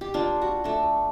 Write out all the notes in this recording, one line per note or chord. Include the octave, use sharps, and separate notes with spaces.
G4
A#3 D4 F4
F#4
A3 D4